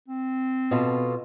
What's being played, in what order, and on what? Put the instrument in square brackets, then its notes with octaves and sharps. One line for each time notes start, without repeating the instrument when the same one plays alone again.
[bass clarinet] C4
[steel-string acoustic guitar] B2 F4 A4